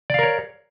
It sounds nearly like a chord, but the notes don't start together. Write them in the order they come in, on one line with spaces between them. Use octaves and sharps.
D5 F5 A#4 C#5